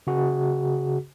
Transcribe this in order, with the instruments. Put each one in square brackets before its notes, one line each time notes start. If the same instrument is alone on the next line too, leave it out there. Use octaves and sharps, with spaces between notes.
[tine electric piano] C#3 F#4 G#4